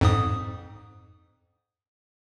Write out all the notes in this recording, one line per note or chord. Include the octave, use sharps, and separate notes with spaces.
F2 G#2 D#6